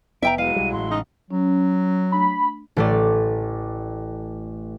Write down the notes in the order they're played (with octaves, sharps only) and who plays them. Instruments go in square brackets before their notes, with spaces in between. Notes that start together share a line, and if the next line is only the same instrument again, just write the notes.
[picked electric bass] F1 B3 [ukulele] E5 G5 A#5 [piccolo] D7
[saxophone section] F#3 G#3 E4 [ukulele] F5 [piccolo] D#7
[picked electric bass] B1 G3
[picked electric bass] A1 A2 [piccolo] C6
[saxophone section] C#3 G#3 D#4
[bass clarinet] F#3 [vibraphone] C#4
[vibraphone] A3 D4 [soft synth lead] B5
[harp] A1 A3 D5